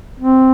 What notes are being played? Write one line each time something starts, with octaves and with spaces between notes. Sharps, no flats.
C4